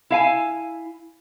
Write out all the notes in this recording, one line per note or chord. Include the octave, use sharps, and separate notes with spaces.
E4 F5 G#5